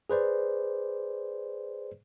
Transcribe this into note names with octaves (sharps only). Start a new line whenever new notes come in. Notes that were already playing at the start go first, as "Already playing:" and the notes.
G#4 B4 C5 D5